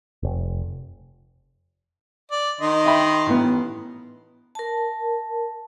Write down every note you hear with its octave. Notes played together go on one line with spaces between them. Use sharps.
F1
D5
D#3 D#5 C6
E5 G5 B5
A1 B3
A#4 A5